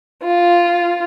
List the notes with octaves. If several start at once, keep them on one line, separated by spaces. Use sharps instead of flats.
F4